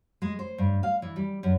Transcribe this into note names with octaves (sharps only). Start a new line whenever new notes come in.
G#3
C5
G2
F5
E3
G3
F#2